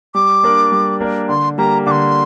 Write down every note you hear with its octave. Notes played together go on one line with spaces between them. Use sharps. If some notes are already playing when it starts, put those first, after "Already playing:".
G3 D6
A#3 D4 A#4 D5
G3
A#3 D4 A#4 D5
D3 C6
G3 A#3 G4 A#5
D3 C6 D6